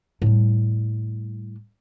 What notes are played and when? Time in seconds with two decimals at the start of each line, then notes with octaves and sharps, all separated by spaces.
0.22 A2 G3